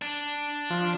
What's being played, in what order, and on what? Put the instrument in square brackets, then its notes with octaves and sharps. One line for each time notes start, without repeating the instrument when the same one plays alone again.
[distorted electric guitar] D4
[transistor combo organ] F3